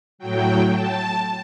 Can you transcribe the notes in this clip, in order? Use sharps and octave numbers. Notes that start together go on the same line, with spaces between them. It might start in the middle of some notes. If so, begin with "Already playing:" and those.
A2 F#3 G5
A5